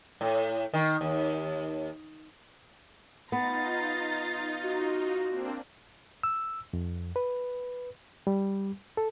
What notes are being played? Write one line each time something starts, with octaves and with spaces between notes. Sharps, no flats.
A2
D#3
D#2
B3 D#4 F4 A#5 A6 C7
F#4
A#3 C4 D4
E6
F2
B4
G3
A4